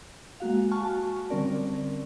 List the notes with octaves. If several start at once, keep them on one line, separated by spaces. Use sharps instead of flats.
G#3 A#3 F#4 F5
G#5 A5 C#6 F6
F#4 A5
D3 G3 C4 C#4 A#4 D5